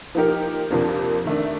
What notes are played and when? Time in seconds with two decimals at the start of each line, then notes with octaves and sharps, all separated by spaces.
0.15 F3 A#3 D#4 G4 A#4
0.70 F2 C3 F3 A#3 D4
1.25 D#3 A3 D4